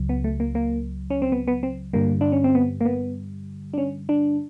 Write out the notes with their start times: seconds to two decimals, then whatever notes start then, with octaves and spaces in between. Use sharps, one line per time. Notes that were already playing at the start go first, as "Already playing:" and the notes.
Already playing: C#2 C#3 F#3
0.09 B3
0.24 A3
0.40 A#3
0.55 A#3
1.10 C#4
1.22 C4
1.32 B3
1.48 B3
1.63 C4
1.93 G2 D3 G3 A#3
2.21 D4
2.32 C#4
2.44 C4
2.55 B3
2.81 A#3
2.85 B3
3.74 D4
3.78 C#4
4.09 D4